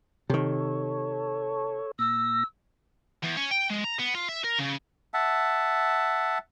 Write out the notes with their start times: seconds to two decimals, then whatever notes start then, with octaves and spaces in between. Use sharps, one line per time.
0.30 C3 D#3 A4 C#5
1.99 A#2 E6 A#6
3.23 E2
3.36 C#4
3.51 G5
3.70 G#3
3.84 A#5
3.99 B3
4.15 F4
4.29 E5
4.44 A#4
4.59 C#3
5.14 E5 F#5 A5